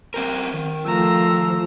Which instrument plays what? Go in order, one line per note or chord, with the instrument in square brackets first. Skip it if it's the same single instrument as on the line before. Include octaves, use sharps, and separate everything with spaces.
[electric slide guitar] C4 G4 A#4
D#3
[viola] F3 A3 [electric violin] A#5 E6